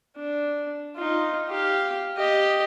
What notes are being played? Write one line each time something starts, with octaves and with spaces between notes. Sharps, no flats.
D4
D#4 F4
G4 F5
G4 D#5